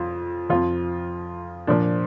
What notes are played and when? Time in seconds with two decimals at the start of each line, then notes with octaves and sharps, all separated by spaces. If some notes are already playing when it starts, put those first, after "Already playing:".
Already playing: F2 F4
0.50 F2 F3 F4
1.67 A#2 F3 D4